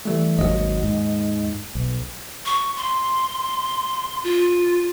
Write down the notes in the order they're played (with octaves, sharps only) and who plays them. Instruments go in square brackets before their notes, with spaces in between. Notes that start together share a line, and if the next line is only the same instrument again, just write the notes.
[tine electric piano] E3 G3 A3
[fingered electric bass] G#1 C#3 F#3 [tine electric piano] D#2 D#5
[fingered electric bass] G#2
B1
[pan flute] C#6
C6
F4